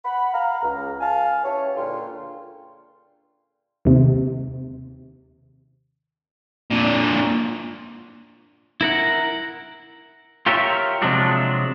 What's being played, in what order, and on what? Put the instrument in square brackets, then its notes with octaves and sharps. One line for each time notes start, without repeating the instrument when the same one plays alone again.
[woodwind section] F#5 B5
F5 A#5
C#2
F5 G#5 A5
C#4 E4 G4 B4 C#5
C#2 A#2 D3 F4 G5 C6
[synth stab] D#2 C3
[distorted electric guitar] A#2 D3
[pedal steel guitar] E4 A#4 F#5
[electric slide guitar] F4 G4 A#4 C#5 E5
C3 F3 F#3 G#3 D4 F4